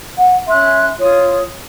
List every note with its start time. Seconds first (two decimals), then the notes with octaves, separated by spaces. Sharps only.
0.17 F#5
0.47 C#4 E5 C6 F#6
0.99 F4 C#5 D#6